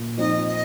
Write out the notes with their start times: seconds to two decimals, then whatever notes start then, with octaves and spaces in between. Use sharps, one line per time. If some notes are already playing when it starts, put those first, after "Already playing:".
Already playing: A#2
0.17 F3 C4 D#4 D#5
0.47 D#5